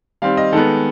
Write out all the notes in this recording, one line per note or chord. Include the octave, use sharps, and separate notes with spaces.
D#3 G3 C4 F5
D#5
D#3 G#3 B3 A4